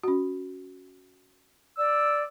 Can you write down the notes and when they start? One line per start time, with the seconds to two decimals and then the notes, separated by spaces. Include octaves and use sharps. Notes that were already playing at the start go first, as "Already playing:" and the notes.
0.04 C#4 F#4
1.78 D5 E6